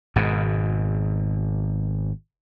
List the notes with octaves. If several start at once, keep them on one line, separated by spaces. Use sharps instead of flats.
G#1 G#2 B2